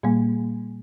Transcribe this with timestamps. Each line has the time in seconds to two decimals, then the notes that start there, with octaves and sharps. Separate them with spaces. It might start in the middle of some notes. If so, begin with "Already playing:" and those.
0.03 A#2 G3 A#3